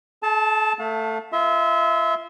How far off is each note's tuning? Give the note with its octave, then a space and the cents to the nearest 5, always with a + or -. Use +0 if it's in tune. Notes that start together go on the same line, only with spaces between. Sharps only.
A4 -45 A5 -5
A3 +15 F5 +40
F4 -35 E5 -25 C6 +0